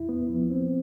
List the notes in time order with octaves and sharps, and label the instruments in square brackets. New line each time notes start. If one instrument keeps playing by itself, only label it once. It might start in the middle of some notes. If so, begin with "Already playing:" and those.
Already playing: [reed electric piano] E2 E4
B3
F3
C4